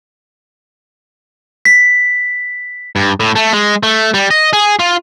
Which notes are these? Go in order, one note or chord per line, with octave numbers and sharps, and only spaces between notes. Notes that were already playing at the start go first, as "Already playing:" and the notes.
B6
G2
A2
A3
G#3
A3
G3
D#5
G#4
F4